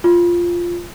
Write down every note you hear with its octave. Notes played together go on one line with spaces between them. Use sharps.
F4